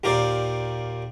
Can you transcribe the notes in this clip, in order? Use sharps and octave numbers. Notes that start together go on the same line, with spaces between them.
D#2 A#2 A#4 C5 D5